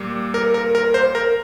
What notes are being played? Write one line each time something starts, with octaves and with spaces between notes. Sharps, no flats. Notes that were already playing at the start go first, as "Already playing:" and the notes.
Already playing: A#2 G3 A#3
A#4
A#4
A#4
C5
A#4